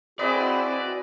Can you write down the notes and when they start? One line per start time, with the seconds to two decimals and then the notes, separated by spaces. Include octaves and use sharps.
0.19 C4 E4 F#4 G#4 B4 D5 D#5